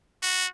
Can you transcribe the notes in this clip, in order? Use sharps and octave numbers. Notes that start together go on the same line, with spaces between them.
F#4